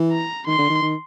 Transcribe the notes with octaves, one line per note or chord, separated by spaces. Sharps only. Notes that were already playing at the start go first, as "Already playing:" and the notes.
Already playing: E3
A#5
D#3 C6
D3
D#3
D#3